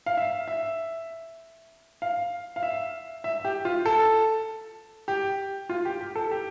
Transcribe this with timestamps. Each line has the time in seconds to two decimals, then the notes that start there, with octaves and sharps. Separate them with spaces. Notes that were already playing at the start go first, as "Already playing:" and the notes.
0.06 F5
0.17 E5
0.48 E5
2.02 F5
2.56 F5
2.63 E5
3.24 E5
3.45 G4
3.65 F4
3.86 A4
5.08 G4
5.70 F4
5.85 G4
6.01 G4
6.15 A4
6.31 G4